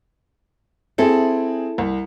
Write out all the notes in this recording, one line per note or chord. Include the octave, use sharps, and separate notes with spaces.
C4 E4 G#4 A4
C2